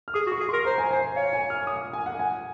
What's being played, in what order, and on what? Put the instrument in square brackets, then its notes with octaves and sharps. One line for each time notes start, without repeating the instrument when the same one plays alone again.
[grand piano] F6
[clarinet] G#4 [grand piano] D#6
[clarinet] F#4
[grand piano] C#6
[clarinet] G#4
[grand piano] C6
[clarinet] A#4
[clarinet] C5 [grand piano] A#5
[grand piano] G#5
[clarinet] C5 [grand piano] G#5
[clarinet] C#5 [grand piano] F5
[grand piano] G#5
F6
D#6
G#5
F#5
G#5